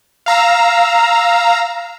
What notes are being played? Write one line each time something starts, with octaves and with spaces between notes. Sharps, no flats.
F5 A#5 E6